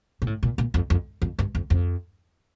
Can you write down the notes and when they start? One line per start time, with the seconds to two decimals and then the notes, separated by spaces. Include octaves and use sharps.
0.22 A#2
0.27 A2
0.43 A#2
0.58 A#2
0.74 F2
0.90 F2
1.22 F2
1.39 G2
1.55 F2
1.70 F2